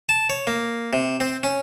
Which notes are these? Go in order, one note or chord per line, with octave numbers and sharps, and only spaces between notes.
A5
C#5
A#3
C3
C4
C#4